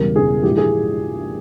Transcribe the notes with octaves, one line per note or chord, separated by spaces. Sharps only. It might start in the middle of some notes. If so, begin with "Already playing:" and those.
Already playing: E1 E2 C#3 G3 A#4
E1 E2 C#3 G3 G#4
A#1 G#2 E3 G4
G#4